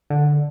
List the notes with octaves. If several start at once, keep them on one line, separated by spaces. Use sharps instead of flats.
D3